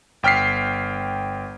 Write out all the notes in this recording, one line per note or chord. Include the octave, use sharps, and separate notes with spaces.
G1 G5 F6 B6 C7